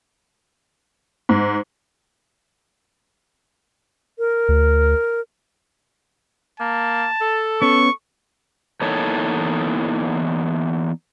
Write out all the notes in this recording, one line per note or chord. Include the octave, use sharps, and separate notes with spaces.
G#2
A#4
D2
A#3 A5
A4
B3 C#4 C#6
E2 E3 A#3 D#4 A4 C#5